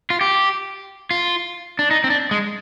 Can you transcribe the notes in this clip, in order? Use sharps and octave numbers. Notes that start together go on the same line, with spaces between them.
F4
G4
F4
D4
D#4
C4
D4
G#3